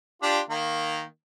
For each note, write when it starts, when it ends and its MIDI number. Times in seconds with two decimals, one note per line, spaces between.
0.22 0.39 62
0.22 0.39 65
0.22 0.39 67
0.50 1.03 51
0.50 1.03 58